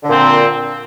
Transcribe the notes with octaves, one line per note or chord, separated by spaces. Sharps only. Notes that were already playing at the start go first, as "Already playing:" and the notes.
A#2 D3 C4